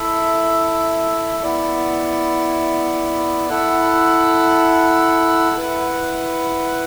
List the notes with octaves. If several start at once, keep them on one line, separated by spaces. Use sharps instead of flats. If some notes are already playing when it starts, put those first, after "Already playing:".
Already playing: E4 A4 E5
B3 E4 D5
E4 A4 F#5
E4 B4 F#5